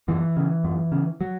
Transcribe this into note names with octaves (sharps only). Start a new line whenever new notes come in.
F#2 E3
C#3
F#2
C#3
F#3